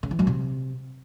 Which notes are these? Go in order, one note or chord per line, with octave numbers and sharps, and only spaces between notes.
C#3
E3
F#2
C3